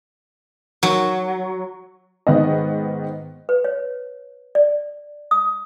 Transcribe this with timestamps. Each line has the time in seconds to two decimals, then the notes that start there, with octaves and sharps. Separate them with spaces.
0.83 F#3
2.27 G#2 D#3 B3 D#5
3.49 B4
3.64 C#5
4.55 D5
5.31 D#6